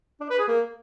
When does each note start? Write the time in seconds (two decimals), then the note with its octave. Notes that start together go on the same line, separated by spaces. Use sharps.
0.21 D4
0.30 B4
0.39 G#4
0.48 A#3